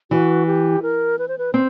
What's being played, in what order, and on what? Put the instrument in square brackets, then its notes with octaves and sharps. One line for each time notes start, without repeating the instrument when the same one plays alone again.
[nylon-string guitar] E3 [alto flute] F#4
[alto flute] G4
A#4
B4
C5
B4
[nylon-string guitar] C4 [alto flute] C5